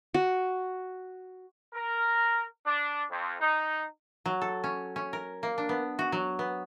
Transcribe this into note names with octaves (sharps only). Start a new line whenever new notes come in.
F#4
A#4
D4
F2
D#4
F#3
A4
C#4
C#4
A#4
A#3
D4
B3
F#4
F#3
B3